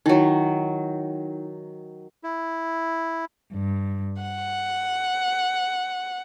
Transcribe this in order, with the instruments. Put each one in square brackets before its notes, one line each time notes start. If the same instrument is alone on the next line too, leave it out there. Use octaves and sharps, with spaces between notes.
[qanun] D#3 F#3 [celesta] D#4 E4
[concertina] E4
[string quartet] G2
F#5